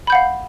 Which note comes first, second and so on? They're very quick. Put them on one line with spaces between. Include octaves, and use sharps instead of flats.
B5 G6 F#5 F5